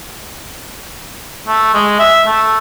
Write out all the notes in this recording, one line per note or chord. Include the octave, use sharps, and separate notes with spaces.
A3
G#3
E5
A3